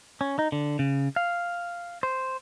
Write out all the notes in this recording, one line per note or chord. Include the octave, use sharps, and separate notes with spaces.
C#4
D#4
D3
C#3
F5
C5